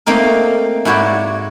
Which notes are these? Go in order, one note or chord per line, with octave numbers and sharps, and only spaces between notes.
A3 A#3 C4 D#4 A#4
G#2 E4 F#4 C#5 D5